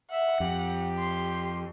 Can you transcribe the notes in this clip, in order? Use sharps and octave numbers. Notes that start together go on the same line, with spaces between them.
E5 F#5
F2 G4
C6